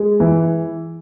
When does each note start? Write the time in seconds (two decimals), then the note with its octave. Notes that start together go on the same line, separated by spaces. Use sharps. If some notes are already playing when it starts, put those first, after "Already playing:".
Already playing: G#3
0.20 E3